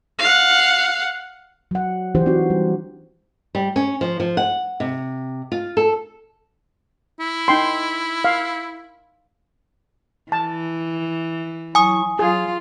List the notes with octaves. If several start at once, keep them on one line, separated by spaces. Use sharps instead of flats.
F5 F#5
F#3 F#5
E3 D4 F4 G4 C5
C4 D#4 F#4
G3
G3
C#4
F3
F3
F#5
C3
F4
A4
E4
D#4 G5 C6
F5
E3 A5
F#3 E4 G#5 C#6 D#6
F#3 F4 G#4